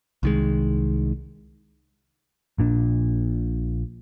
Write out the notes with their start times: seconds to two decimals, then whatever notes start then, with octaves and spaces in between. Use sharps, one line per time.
0.23 C2 D#3 G#3
2.58 A#1 A#2 D4